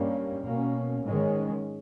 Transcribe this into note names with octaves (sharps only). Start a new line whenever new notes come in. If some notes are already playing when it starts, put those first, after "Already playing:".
Already playing: G2 G3 A#3 C#4
B2 A#3 C#4
G#2 D#3 G#3 C#4